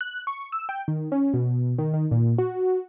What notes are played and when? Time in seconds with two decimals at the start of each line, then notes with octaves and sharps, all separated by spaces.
0.01 F#6
0.27 C#6
0.52 E6
0.69 G5
0.88 D#3
1.12 C#4
1.34 B2
1.78 D#3
1.94 D#3
2.11 A#2
2.38 F#4